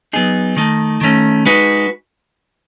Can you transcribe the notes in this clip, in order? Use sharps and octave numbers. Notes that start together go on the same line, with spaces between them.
F#3 B3 D#4 G#4
D#3 A3 D#4
D#3 A3 C#4
G#3 D#4 F#4 B4